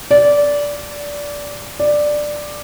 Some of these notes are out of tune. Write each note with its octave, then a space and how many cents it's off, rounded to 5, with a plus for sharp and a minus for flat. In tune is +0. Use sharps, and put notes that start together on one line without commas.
D5 -15
D5 +10